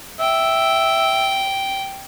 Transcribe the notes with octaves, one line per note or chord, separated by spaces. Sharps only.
E5 G5